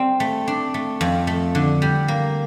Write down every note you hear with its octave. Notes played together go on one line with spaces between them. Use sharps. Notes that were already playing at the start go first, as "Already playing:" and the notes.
Already playing: G3 C4
A3
D4
A3
F2
A3
D3
G3
A#3